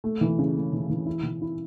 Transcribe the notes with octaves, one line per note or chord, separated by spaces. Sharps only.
A3
E3
C#3
A3
E3
E3
E4
E3
E4